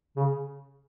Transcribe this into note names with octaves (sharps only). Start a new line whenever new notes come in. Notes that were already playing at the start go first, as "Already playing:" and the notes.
C#3